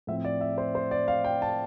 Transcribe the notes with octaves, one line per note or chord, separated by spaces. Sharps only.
A2 F3 C4 E5
D5
E5
C5
C5
D5
F5
G5
A5